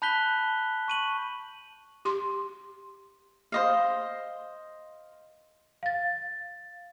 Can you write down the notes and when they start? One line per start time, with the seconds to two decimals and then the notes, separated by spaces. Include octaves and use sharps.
0.02 A5 B5 F#6 G6 B6 G7
0.88 C#6 D#7 F#7
2.05 G4 C6
3.52 C5 D#5 F5
5.83 F5 A6